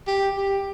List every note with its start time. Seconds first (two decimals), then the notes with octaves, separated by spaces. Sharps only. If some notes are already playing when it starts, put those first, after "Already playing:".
0.08 G4
0.37 G4